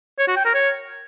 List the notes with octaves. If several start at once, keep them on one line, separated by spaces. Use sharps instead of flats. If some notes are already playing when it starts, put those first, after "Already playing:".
C#5
F#4
G5
A#4
C#5